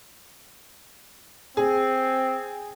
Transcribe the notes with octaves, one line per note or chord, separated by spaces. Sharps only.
C4 G#4